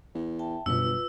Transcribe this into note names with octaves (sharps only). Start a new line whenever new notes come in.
E2
E5 G5 A5
G1 F#2 B2 F4 B4 E6